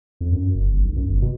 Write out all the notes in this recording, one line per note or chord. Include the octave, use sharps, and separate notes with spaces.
F2
F#2
F#1
G1
B1
F#2
G1
B2